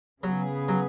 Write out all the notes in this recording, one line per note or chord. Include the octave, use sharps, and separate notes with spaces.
C#3 F#3 B3 G#4 B4
F#3